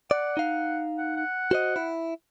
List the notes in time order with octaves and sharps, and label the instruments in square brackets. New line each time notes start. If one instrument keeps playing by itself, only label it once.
[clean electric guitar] D5 [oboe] F#5
[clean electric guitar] D#4 F5
[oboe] F#5
F#5
[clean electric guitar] F#4 C5 D#5
E4